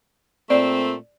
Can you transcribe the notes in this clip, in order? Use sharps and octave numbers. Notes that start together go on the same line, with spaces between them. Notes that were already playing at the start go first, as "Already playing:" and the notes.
A#2 A3 C4 D5